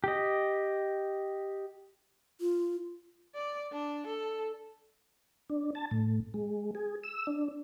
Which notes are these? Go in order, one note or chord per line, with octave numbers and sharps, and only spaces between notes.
G4 D#5
F4
D5
D4
A4
D4
A5
A2
G#3
G#4
E6
D4